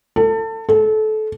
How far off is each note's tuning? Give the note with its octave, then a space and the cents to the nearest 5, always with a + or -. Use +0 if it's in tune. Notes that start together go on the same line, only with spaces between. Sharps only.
A4 +25
A4 -25